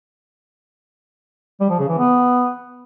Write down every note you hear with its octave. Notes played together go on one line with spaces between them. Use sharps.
G3
F3
C#3
E3
B3